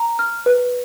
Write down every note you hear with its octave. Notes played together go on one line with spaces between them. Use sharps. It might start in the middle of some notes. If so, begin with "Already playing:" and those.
Already playing: A#5
F6
B4